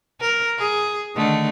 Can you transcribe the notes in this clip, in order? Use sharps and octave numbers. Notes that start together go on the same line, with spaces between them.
A#4
G#4
D3 D#3 A3